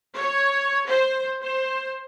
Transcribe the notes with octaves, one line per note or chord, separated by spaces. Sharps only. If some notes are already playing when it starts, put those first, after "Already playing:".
C#5
C5
C5